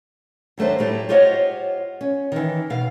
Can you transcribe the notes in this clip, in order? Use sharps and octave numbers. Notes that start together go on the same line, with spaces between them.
D#2 F#3 A3 D4 C5
A2 G3 A3 G4
F4 G4 C5 C#5 D#5 F#5
C#4
D#3 E3
B2 F5